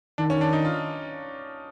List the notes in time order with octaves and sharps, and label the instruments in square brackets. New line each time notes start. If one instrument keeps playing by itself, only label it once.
[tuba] D#3 [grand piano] D4
[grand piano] C#4
D4
D#4
F4